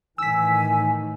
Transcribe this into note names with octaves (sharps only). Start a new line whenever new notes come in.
A2 D#3 E3 G#5 E6 B6